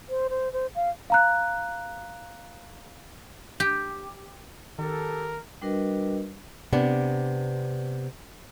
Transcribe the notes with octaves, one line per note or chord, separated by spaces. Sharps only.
C5
C5
C5
F5
F5 A#5 F#6
G4
D#3 G4 A4 A#4
G3 D4 F#4 A#4 B4 D#5
C3 B3 D4